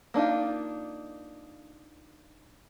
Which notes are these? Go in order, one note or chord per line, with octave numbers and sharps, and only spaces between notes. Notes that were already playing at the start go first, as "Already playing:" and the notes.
A#3 D4 D#4 F4